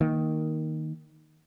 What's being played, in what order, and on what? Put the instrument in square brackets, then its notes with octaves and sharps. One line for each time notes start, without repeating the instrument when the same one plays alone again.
[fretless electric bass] D#3 A#3